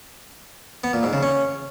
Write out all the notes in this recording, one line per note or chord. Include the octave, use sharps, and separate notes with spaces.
B3
A#2
G#2
C#3
C#4